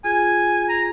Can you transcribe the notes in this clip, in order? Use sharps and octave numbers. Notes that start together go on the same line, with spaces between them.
F4 G#4 G#5
A#5